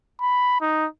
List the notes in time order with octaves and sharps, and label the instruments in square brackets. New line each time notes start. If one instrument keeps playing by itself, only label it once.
[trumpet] B5
D#4